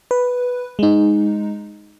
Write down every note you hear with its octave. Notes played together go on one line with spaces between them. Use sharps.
B4
G#3 D#4